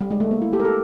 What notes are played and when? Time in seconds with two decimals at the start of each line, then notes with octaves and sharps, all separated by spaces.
0.01 G3
0.11 G#3
0.20 A3
0.31 A#3
0.42 E4
0.53 G4 A4
0.60 A#4
0.64 G4 A4